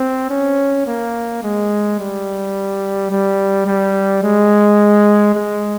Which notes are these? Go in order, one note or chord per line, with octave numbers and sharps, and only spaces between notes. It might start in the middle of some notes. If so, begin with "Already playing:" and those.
Already playing: C4
C#4
A#3
G#3
G3
G3
G3
G#3
G#3